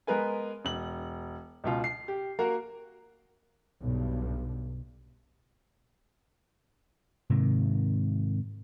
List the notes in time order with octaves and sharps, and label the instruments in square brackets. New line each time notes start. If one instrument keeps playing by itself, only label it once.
[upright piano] G#3 B3 A#4 B4 G#5
E1 F#7
C#2 B2 F4
C7
G4
A#3 F#4 A#4
[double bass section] B1 G2
[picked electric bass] G#2 C3 D#3